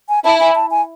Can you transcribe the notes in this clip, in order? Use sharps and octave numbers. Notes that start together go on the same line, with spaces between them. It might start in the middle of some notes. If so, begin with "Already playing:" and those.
G#5
E4 A5
G#5
A5
G#5